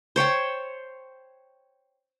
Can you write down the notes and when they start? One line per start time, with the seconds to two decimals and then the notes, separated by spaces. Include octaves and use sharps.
0.16 C5 C#5 G5 A5